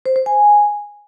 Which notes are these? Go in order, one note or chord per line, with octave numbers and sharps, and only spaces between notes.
C5
C5
G#5